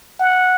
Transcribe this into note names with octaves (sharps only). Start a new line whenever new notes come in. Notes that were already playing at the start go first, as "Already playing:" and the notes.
F#5